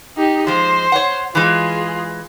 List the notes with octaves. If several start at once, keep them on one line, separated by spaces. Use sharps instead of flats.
D#4 G4
F3 G#3 C5
C#5 F#5
E3 G#3 F4 G#4